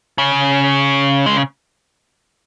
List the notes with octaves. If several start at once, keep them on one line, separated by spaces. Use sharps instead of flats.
C#3
G#3